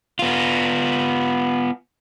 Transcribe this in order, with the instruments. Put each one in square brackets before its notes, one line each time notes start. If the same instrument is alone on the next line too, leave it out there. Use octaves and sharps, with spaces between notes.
[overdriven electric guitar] B3 F4